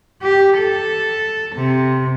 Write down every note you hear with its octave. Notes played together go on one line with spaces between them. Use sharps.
G4
A4
C3